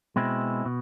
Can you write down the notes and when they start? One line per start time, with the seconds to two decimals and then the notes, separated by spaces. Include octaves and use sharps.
0.16 B2 G#3 C4 E4
0.65 B2